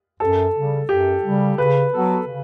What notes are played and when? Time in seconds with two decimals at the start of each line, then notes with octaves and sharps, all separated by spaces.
0.20 F#2 A4
0.55 C#3 G3
0.89 F#2 G4
1.24 C#3 G3
1.58 C#3 B4
1.92 F#3 B3 F#4 A4
2.27 C#3